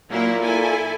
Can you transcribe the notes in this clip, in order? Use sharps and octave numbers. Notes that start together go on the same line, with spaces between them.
A#2 F#3 A#3 E4
E4 A4 G#5